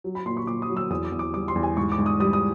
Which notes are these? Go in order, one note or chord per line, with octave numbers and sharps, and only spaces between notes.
F#3
B5
A#2 C6
C#6
A#2 D6
D#6
F#3
E6
E2 D#6
D6
E2
D6
G3 D6
C6
E2
G#5
G#2 C#6
D6
G#2
D#6
G3 D#6
D#6